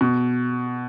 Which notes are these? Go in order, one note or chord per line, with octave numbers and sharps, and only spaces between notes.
B2